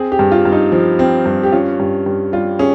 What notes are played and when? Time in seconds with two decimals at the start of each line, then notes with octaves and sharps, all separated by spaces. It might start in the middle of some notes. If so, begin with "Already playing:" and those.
Already playing: C4 G#4
0.12 G4
0.19 G2
0.32 F4
0.45 G2
0.52 D#4
0.72 F3
0.99 C4
1.26 G2
1.43 G4
1.52 C#4 F4
1.80 G2
2.06 G2
2.33 G3 F4
2.59 C#4 G#4